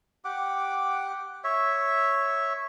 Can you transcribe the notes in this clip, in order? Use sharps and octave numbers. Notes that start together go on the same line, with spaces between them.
G4 F#5 D6
C#5 E5